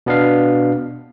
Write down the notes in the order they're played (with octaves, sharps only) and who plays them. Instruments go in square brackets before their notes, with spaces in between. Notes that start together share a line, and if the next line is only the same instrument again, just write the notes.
[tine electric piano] B2 B3 D4 F5